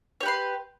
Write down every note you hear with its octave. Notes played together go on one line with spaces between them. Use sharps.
G4 B4 C#5 C6